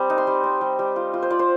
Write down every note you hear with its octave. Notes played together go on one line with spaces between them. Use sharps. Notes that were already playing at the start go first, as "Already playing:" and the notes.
Already playing: G3 C4
D#4
C6
G3
C4
G3
G3
F4
F4
C5
F4 D5
C5